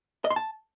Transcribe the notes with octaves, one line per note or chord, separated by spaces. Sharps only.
D#5
C6
A5